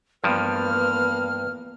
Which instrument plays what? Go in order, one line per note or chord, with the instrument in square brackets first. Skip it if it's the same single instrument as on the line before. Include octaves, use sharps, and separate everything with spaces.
[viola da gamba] E2 A#3 [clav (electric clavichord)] G2 F3 [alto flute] B4 [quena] F6